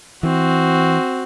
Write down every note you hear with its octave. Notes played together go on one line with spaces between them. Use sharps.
E3 C4 F#4